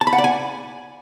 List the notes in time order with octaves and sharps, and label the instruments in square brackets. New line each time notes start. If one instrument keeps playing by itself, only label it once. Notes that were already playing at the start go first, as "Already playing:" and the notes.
[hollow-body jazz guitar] A5
B5
F#5
D5
G#5